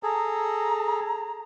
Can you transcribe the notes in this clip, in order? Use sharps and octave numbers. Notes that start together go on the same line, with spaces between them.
G#4 A4 A#5